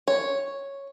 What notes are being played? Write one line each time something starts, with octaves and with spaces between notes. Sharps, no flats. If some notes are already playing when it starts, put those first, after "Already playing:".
C#5